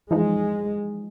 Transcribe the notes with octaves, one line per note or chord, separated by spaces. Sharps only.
E3 F3 G#3 D#4